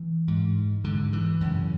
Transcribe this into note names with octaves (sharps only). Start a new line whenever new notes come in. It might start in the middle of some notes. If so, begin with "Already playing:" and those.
Already playing: E3
G#2
G#2 D3
E3
F#2 C#3